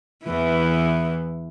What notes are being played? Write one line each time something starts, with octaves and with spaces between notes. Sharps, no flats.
E2 E3